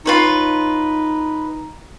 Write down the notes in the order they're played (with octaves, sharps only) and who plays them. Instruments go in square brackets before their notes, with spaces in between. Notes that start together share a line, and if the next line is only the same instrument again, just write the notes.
[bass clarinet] D#4 [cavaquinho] F4 B4 C#5